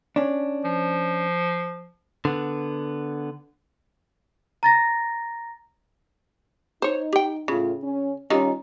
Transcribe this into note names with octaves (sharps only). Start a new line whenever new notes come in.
C#4 D4
F3
D3 B3
A#5 A6 A#6
D#4 C5 C#5
G4 G5
A2 C#3 F4
C#4
D#3 G3 C#4 D#4 F4